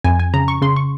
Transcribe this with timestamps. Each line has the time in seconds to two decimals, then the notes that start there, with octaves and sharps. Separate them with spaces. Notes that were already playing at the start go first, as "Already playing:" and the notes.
0.04 F2 G#5
0.19 G#5
0.34 C#3 A#5
0.48 C#6
0.62 C#3 C6
0.76 C#6